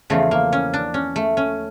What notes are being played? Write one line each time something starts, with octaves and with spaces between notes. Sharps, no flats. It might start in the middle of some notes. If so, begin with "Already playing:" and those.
E2 C#3 F3 A3
A#3
C#4
D4
C#4
A3
C#4